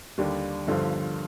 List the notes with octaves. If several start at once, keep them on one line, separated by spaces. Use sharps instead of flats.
D#2 D3 G3 D4
G1 G2 D3 F3